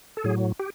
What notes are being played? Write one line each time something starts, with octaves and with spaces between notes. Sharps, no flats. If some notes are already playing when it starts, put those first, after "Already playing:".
A4
A2 F#3 G#4
G4